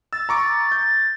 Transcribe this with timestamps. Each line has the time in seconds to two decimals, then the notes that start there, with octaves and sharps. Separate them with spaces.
0.13 E6 A6
0.29 A#5 C#6 D6
0.72 G6